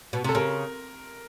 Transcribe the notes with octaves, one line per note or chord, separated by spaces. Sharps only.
B2
C3 A4
C#3 A#4